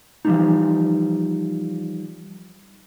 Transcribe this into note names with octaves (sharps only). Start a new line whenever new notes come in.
E3 F3 G3 A#3 D4 D#4